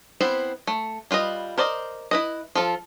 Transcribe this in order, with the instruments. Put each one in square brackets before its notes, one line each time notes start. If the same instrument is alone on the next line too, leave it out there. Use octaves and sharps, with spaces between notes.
[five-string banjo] B3 C4 E4 C5
A3
G3 F4 B4 D#5
A#4 C5 D5 D#5
E4 B4 D#5
F3 F4 A4